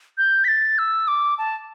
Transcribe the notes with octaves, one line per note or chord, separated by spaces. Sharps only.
G6
B6
A6
E6
D6
A5